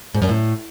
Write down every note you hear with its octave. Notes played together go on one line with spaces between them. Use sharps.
G#2
F#2
A2